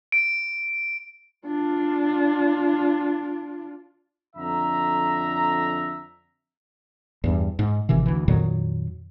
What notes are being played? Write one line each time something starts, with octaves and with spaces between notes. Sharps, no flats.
D7
D4 F4
F2 D3 E5 A#5
E2 G2
G#2
G#1 C3 D#3 E3
D2 E3
F2 A#2 D#3 F#3